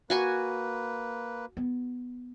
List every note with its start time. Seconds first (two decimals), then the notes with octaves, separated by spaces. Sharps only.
0.10 A#3 F#4 B4 G#5 C#6
1.57 B3